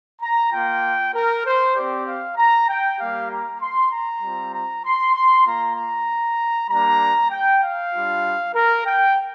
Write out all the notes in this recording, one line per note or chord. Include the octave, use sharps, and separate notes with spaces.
A#5
A#3 F4 G5
A#4
C5
C4 G4 D5
F5
A#5
G5
G3 A#3 G4 F5
A#5
C6
A#5
G3 C4 F4
A#5
C6
C6
A#3 F4 A#5
A#5
G3 A#3 D4 A#5
G5
F5
G3 D4 F4
A#4
G5